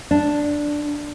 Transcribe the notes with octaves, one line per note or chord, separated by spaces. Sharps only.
D4